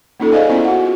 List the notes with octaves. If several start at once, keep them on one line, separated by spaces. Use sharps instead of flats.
A#3 C#4 D#4 F4 A4
G#4 C5 D5 D#5 F5 G#5
B3 C#4 E4 F4 G#5
F#4 F#5
F4